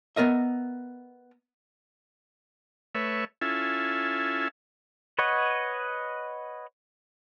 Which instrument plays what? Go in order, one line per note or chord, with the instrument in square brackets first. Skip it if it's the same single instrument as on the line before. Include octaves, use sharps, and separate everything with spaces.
[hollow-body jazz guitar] B3 A#4 D#5 E5
[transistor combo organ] A3 B4 C#5 E5
C#4 E4 F4 A4 E5 G#5
[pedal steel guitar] B4 C#5 D#5 F#5